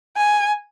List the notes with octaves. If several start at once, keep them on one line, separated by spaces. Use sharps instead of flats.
G#5